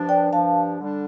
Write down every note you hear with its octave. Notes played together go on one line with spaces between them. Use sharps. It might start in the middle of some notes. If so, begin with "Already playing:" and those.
Already playing: G2 F3 D4
D5 G5
G2 F3 D4 F5 A5
D3 G3 D4